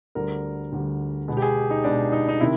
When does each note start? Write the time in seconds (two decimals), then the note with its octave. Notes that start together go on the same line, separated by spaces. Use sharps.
0.15 D2 D3 G3 A#4
0.72 D2 D3 G3
1.28 B2 G#3 B3
1.37 G4
1.42 G#4
1.70 D#4
1.84 B2 G#3 B3 D4
2.12 D#4
2.29 D#4
2.40 C3 D#3 E4